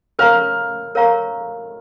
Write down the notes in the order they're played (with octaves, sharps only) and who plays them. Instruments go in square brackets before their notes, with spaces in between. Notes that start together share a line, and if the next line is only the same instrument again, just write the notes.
[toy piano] A#4 C#5 F5 A#5 C#6 [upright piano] F6
[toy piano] A#4 C#5 F5 A#5 C#6